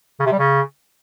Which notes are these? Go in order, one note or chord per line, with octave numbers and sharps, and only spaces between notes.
C#3
C3
G3
C#3